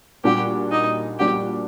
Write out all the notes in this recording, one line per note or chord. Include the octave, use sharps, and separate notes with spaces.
A#2 G3 D4 F#4 G4
D#4
A#2 G3 D4 F#4 G4